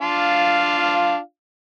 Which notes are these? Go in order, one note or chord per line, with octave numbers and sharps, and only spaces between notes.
D4 F4 F5